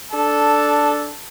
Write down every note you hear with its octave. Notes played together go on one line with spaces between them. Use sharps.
D4 A4